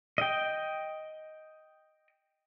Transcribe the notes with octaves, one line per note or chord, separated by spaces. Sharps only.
D#5 G5